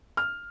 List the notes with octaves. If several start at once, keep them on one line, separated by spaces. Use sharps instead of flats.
F6